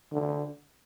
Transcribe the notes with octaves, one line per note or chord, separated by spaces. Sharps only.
D3